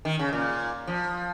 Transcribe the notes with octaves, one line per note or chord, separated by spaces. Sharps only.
D#3
C#3
A#2
F3